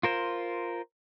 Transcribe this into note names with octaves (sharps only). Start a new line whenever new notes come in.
F4 A#4 C5